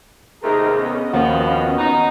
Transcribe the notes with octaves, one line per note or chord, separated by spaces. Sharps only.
D#2 C3 A3 D#4 G#4 A#4
B3 C#4 D#5
D#2 F3 F#4
D#4